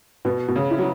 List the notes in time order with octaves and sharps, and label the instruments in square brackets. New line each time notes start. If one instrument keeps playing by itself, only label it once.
[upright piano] B2 [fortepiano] B3
[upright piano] B2
C#3
[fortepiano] E4
[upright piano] F#3